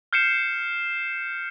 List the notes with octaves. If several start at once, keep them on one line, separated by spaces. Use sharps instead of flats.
F6 G6 C7 C#7 E7